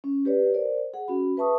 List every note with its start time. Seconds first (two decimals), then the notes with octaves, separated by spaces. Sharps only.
0.04 C#4
0.25 G4 B4 C#5 D5
0.54 A#4 C5 D5
0.94 G#4 F#5
1.08 C#4 F#4 B5
1.36 G#4 B4 E5 A5 C#6 D#6